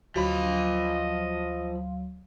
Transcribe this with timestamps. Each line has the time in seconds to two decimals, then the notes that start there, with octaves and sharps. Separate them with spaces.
0.16 D2 F3 F#3 D#5 F5 B5 C6